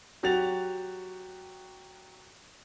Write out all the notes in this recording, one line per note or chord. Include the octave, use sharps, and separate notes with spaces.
F#3 F#4 G4 A6 F7